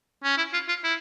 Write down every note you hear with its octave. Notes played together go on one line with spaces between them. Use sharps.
C#4
E4
F4
F4
E4